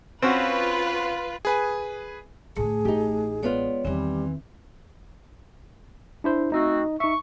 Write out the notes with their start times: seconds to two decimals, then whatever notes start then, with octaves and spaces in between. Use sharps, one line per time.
0.22 C4 C#4 F4 F#4 B4
1.45 G#4 B4 G#5
2.57 A2 D3 A3 G#4
2.85 A1 D#4 G4
3.43 G#3 B3 F4 C#5 D5
3.85 E2 D#3 E3 G3 C4
6.24 D4 E4 C5
6.52 A3 C4 D#4 F#4 D#5
7.00 D#4 E5 C#6